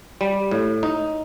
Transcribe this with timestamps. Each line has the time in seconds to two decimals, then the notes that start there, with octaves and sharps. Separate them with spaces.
0.21 G3
0.51 A2
0.83 D#4